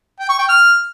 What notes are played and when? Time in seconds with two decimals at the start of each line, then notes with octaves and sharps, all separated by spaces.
0.20 G5
0.29 C#6
0.39 G5
0.49 F6